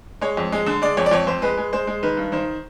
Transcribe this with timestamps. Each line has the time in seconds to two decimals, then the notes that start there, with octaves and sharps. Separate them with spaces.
0.21 G#3 C#5
0.37 F2
0.52 G#3
0.66 D3
0.82 G#3 D5
0.97 F2 C#5
1.06 D5
1.11 F2 C#5
1.27 F2 C5
1.42 G#3 B4
1.57 G#3
1.73 G#3 C5
1.87 G#3
2.03 D#3 B4
2.17 G2
2.32 D#3 C5